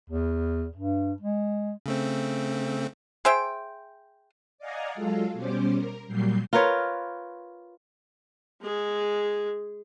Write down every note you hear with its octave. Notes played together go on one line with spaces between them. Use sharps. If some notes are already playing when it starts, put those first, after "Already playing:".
E2
G2
G#3
C#3 A3 C4
G#4 C5 E5 G5
D5 D#5 F5 F#5 G#5 A#5
F#3 G#3 F4 A4 F5
B2 G3 C#4 C5 D6
A#4
A#2 F#3 G3 G6 C7
F4 A#4 B4 C#5
G#3 G#4